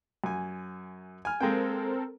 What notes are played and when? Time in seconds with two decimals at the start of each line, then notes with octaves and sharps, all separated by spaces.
0.24 F#2 G#5
1.25 G#5 F6
1.41 G#3 A#3 C4 A4 A#4 G5